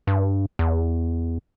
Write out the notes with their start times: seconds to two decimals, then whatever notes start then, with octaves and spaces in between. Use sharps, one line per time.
0.07 G2
0.59 E2